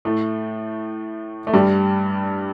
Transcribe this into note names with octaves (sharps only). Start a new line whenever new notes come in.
A2 A3
A3
G2 G3